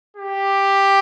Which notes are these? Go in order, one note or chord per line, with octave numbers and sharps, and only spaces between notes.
G4